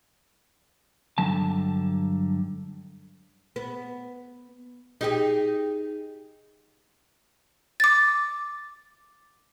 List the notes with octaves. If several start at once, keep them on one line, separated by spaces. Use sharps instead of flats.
G2 D3 F#3 A5
B3
D#4 G4 G#4
D6 A6